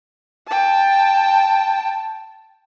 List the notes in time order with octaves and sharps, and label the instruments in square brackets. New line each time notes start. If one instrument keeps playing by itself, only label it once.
[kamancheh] G5 A5